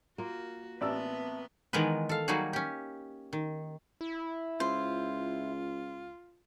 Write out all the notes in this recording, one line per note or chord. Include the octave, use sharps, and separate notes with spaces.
A#3 F4 F#4
A1 B3 C4 B4 D5 E5 A5 E6
D#3 E3 G#3 B3 A#4 B4
A4 F5
F#3 G3 A#3 D#4 F#4 G#4
C#4 G4
D#3
E4
C#2 F4 C5